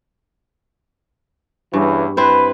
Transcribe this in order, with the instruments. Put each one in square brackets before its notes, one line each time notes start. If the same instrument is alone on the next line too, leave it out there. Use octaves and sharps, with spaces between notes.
[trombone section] E2 C#3 E3 [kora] G2
[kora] C4 E4 C5 [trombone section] B4